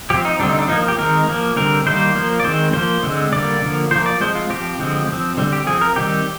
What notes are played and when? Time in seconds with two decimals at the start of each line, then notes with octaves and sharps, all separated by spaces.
0.10 F3 C4 G4
0.25 D#4
0.40 D3 G3 C4 D4
0.49 D#4
0.59 D4
0.68 F3 A#3 D#4
0.88 G4
0.97 D#3 G#3 C4 A#4
1.28 F3 A#3
1.56 D3 G3 C4 A#4
1.86 D#3 G3 A#3 C5
2.15 F3 A#3
2.40 D5
2.44 D#3 G#3 C4 C5
2.73 F3 A#3 C5
3.03 D3 G#3 C4
3.32 D3 G3 A#3 D5
3.62 D3 F3 A#3
3.91 F3 A#3 C5
4.06 D5
4.20 F3 G#3 C4 C5
4.35 F4
4.50 F3 C4 G4
4.79 D3 F3 G#3 C4
5.09 F3 C4
5.37 D3 G3 C4
5.53 G4
5.67 F3 C4 G#4
5.81 A#4
5.96 D#3 G3 C4 G4